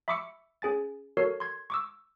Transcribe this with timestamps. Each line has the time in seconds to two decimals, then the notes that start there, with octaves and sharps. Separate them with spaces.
0.08 E5 B5 C#6 D6 E6 C#7
0.62 C#4 G#4 G#5 A6
1.17 F#4 A4 A#4 C#5 C7
1.40 C6 G#6
1.70 C#6 D6 E6